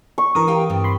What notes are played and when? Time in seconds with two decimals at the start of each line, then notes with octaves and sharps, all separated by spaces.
0.18 C#6
0.35 E3 D4 A#4 D#6
0.48 G4 F5 G5
0.69 G2 G3 C4
0.84 B5 C6